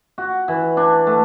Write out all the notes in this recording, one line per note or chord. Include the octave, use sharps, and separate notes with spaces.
F#4
E3
D4
A3